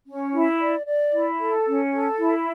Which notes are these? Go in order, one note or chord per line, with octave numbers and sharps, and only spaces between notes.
C#4
E4
D5
D5
E4
A4
C#4
A4
E4